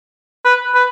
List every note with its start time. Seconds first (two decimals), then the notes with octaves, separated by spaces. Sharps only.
0.45 B4
0.75 B4